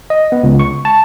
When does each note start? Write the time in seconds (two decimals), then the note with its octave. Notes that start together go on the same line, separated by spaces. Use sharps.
0.10 D#5
0.32 B3
0.43 C#2
0.60 C#6
0.85 A5